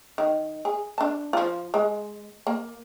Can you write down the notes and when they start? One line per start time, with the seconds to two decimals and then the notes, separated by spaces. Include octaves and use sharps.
0.18 D#3
0.65 G#4
0.98 D4 A5
1.33 F3 F4
1.74 G#3
2.47 A#3